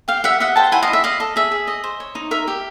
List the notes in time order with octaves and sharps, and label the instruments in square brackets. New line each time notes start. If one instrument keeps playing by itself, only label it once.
[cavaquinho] G4 F5 G5
G4 E5 F#5
D#5 E5 F#5
C5 G5 A5
E4 F#5 G#5
D#5 F5
E4
E5
D5 D#5 F5
A4 D#5
G#4 E5
G#4
D#5
C5
C#5
D#4
A#4 E5
G4